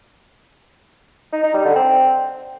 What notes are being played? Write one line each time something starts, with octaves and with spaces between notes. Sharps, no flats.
D#4
D#4
G3
D3
C4